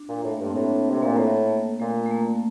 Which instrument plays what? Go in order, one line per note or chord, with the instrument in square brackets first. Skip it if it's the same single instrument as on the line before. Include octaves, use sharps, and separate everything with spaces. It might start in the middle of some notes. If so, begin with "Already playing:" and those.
Already playing: [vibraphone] D4
[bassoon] A#2
[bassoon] A2 [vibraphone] A3
[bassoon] G2 [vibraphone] A#3
[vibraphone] C4
[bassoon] A2 [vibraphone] D4
[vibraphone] C4
[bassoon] C3
[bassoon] A#2 [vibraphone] A#3
[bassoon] A2 [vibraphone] A3
[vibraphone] A#3
[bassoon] A#2 [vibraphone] A3
[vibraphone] A3
A#3